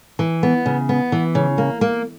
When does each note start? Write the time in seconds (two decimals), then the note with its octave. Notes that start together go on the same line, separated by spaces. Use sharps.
0.19 E3
0.43 B3
0.66 C#3
0.89 B3
1.12 E3
1.35 C#3
1.58 A#3
1.81 A#3